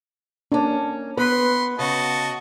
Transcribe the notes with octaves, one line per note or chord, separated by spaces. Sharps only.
A#3 C#4 D4
B3 B4 B5 C6
C#3 F#4 D#5 A5